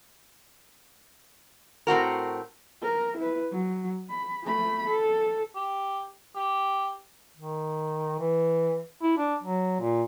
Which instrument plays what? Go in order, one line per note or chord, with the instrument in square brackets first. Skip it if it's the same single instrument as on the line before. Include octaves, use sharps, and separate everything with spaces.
[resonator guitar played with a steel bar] A2 C4 F#4 A#4
[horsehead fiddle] A#4
E4 B4
F#3
B5
A3 B5
A4
[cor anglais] G4
G4
[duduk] D#3
E3
E4
D4
F#3
A#2